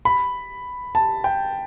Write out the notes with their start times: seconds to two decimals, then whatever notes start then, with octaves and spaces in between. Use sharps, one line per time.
0.05 B5
0.95 A5
1.24 G5